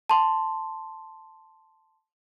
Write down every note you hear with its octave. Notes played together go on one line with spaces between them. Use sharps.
A5 C6